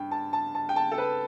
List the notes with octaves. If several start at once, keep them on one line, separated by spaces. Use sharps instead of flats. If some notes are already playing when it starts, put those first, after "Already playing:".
Already playing: G2 G5
A5
A5
A5
G5
A5
A4
B4